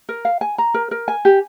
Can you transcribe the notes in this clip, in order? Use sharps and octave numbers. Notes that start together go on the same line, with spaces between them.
A#4
F5
G#5
A#5
A#4
A#4
G#5
G4